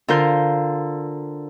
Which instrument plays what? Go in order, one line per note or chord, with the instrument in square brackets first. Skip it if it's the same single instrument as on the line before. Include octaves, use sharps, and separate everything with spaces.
[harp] D3 F4 A#4 C5 G6